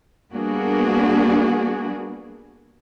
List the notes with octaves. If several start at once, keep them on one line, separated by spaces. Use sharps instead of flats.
G3 A#3 B3 D4 F#4 G#4